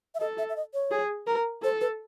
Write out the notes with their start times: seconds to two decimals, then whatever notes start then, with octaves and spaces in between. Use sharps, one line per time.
0.15 E5
0.20 A4 D#5
0.38 E5
0.49 E5
0.56 D#5
0.74 C#5
0.91 G#4
1.27 A#4
1.63 A4 C5
1.81 B4